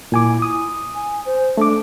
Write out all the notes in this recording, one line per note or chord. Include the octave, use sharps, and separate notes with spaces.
A#2 E4 G#5 D6
D#6
G#5
C5
A3 D4 D6